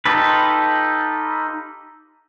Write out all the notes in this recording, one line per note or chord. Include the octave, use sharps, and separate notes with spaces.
D#4 F4 G4 A4 B4